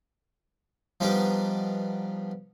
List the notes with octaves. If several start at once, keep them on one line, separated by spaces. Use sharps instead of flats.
F3 G3 B3 D4 D#4 G4